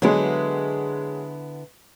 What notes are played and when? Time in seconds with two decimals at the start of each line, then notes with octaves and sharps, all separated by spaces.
0.02 D3 F#3 G#3 B3 E4